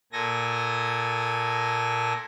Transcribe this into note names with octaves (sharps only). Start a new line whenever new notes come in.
A#2 A4 G#5 A#6